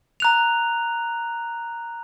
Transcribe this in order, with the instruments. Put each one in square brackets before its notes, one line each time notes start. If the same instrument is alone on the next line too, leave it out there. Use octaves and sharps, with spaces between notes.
[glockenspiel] A#5 F#6 F7